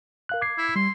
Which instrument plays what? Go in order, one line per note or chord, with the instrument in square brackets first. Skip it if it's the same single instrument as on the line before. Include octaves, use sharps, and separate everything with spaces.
[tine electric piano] A#4 F5 F#6
D6 G#6 C7
[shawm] E4
[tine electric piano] G3 [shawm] C6